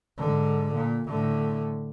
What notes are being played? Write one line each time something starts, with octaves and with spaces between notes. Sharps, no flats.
G#2 D3
A#2
A2 D3